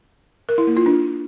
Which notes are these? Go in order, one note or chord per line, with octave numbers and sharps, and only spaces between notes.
A#4
E4
A#3
F4
D4